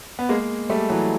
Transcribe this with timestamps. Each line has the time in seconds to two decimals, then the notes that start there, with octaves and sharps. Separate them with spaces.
0.19 B3
0.29 G#3 A#3
0.70 G3 A3
0.90 E3 F#3